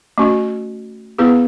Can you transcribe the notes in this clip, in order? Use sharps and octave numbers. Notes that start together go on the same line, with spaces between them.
A3 C#4 F#4
B3 E4 G#4 B4